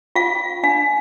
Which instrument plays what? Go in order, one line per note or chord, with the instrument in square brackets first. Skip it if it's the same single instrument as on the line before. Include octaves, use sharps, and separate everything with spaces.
[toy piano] F4 F5
D4 F5